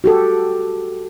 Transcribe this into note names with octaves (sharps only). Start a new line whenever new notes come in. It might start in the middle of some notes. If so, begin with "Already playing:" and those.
F#4 G4 A4